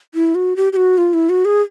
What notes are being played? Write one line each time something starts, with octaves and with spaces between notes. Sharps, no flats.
E4
F#4
G4
G4
F#4
F4
E4
F#4
G#4